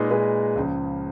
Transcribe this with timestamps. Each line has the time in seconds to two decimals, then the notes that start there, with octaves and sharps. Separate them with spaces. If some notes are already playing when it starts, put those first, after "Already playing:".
Already playing: A#2 G#3 D#4 G#4 B4
0.10 A#2 G#3 D#4 G#4 B4
0.56 C#2 C#3 F3